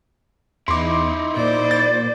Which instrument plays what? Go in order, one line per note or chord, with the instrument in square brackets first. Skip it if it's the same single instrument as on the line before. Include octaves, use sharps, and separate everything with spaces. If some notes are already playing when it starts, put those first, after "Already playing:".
[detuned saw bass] E2 [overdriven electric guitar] D#4 E4 [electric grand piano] C6 D6
[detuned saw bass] A#2 [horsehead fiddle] C5 D5
[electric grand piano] A6